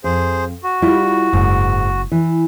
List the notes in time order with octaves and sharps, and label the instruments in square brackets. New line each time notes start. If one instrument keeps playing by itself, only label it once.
[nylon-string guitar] F2 [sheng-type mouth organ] G#4 C5
[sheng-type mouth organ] F#4
[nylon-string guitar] G3 E4 F4
[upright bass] F#1 [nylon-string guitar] G#2
[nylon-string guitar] E3